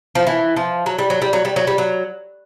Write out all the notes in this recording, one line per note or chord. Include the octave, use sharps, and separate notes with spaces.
F3
E3
F3
F#3
G3
F#3
G3
F#3
G3
F#3
G3
F#3